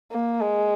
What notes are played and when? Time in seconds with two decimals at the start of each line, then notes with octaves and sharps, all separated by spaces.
0.11 A#3
0.40 G#3